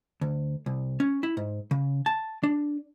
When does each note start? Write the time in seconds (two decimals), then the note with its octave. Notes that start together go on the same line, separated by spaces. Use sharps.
0.21 D2
0.66 C2
1.00 C#4
1.23 E4
1.37 G#2
1.71 C#3
2.06 A5
2.43 D4